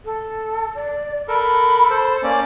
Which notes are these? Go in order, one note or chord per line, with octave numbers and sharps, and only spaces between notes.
A4
D5
A4 A#4 B5
A4 C5
A#3 C#4 D5